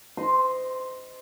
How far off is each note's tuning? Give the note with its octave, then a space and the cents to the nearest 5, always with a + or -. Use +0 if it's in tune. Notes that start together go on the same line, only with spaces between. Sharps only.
C5 -30 D#5 +0 C6 +0